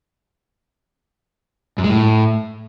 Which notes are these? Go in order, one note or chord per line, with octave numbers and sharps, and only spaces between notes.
F#2
G#3
A2